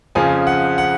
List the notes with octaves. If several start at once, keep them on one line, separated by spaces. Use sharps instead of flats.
F2 C#3 F3 G#5
F#5
F#5